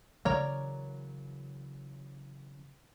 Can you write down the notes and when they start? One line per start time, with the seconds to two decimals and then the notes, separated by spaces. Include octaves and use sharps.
0.25 C#3 E3 F#3 A#4 C#5 D5